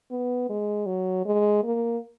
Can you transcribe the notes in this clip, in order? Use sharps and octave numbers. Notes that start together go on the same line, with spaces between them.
B3
G#3
F#3
G#3
A#3